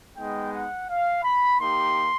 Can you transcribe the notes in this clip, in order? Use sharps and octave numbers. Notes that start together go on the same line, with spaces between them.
G#3 B3 D#4 G5
F#5
F5
B5
A#3 D#4 G4 C6